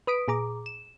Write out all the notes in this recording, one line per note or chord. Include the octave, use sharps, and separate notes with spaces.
B4 D#6 B6 D7
A#2 G#4 A#5 D6
E7